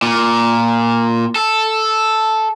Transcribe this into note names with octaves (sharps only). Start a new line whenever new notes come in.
A#2
A4